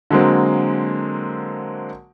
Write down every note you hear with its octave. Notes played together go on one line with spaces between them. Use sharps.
D3 F#3 G#3 A#3 C4